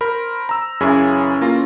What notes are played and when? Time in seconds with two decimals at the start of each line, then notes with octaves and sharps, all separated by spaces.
0.01 A#4 C5 B5
0.49 A#5 E6
0.80 F#2 C#3 E3 C#4 G#4 B5
1.41 A#3 F4 A#5